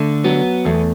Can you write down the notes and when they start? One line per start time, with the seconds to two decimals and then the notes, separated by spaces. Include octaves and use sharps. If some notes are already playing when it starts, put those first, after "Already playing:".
Already playing: D3 A3
0.24 F#3 B3
0.65 E2 A3